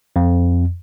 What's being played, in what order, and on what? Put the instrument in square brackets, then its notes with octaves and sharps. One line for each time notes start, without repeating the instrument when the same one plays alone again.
[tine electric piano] F2